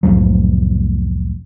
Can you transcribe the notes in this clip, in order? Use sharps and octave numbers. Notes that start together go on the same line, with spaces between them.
C2 F2 A2 F#3